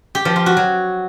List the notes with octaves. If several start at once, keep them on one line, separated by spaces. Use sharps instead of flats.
G4
F3
F4
F#4
F#3